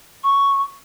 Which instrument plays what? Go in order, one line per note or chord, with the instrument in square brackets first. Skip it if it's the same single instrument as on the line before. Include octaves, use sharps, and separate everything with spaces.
[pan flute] C#6